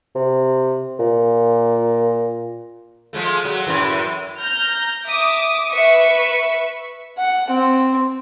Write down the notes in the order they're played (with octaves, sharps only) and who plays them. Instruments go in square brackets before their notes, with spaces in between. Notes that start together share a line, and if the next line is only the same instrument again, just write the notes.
[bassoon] C3
A#2
[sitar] F3 G#3 A3
F#3
F#2 A2 E3
[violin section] A#5 F6 G6
E5 D6 D#6
B4 E5 C#6
[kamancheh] F#5
C4